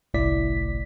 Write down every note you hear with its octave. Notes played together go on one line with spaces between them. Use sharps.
G1 C2 A2 E4 D5 B6